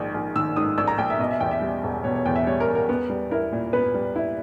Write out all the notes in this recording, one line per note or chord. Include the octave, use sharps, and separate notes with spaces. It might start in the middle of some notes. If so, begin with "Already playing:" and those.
Already playing: A#1 G#2 D#3
A#1
D#3 E6
G#2 D#6
A#1 E6
A#5
A#1 G5
E5
B2 D#5
E5
E2 G5
E5
G3
E1
B2 C#5
C#5
E2 G5
E5
G3 C#5
A#4
E1
A#4
B3
G3
E4 A#4
A#2
B3 B4
G3
E4